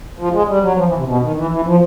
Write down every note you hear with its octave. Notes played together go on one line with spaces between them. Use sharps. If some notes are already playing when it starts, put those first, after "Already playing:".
F3
G#3
G3
F#3
F3
E3
C3
B2
D#3
E3
E3
F3